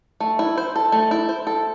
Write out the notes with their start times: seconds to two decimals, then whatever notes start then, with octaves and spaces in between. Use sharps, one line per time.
0.20 A3
0.39 E4
0.58 C5
0.76 A4
0.92 A3
1.11 E4
1.29 C5
1.47 A4